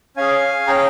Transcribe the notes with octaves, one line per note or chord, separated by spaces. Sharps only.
C#4 G#4 F5 G#5
C#4 G#4 G5 A#5